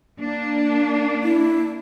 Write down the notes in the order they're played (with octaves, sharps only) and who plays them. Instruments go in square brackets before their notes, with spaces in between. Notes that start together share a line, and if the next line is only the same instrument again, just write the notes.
[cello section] A#3 D4
[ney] E4